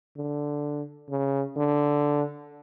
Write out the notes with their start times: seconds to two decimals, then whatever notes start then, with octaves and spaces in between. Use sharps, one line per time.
0.17 D3
1.10 C#3
1.57 D3